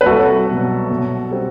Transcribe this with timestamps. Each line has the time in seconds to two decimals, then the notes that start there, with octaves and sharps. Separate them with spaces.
0.01 B4
0.06 C2 F#4 A4
0.48 B2 F#3
0.91 B2
1.31 G3 C4